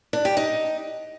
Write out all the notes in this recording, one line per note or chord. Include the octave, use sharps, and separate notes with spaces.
D4
G4
D#4